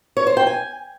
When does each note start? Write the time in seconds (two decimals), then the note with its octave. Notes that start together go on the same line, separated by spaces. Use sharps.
0.17 C#5
0.27 C5
0.37 G5
0.47 G#5